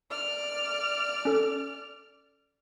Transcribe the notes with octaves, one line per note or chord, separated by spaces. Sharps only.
D5 F6
C#4 A4